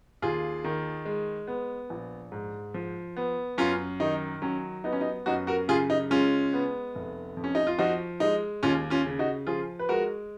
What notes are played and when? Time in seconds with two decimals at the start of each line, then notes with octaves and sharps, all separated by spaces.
0.22 D#2 F4 G#4
0.64 D#3
1.05 G#3
1.47 B3
1.90 A#1
2.32 G#2
2.74 F3
3.17 B3
3.58 F#2 C#4 F4
4.00 D#3 D#4
4.42 F#3 C#4
4.84 B3 D#4
4.92 C#4
5.01 D#4
5.26 F#2 D#4 F#4
5.47 F#4 A#4
5.68 C#3 F4 G#4
5.90 D#4
6.10 G#3 C#4 F4
6.53 B3
6.95 F1
7.37 F2
7.44 C#4
7.55 D#4
7.67 F4
7.79 F3 D#4 F#4
8.20 G#3 D#4
8.63 D#2 C#4 F4
8.90 C#4 F4
9.06 C#3
9.19 D#4 F#4
9.47 F3 F4 G#4
9.79 B4
9.89 G#3 F#4 A#4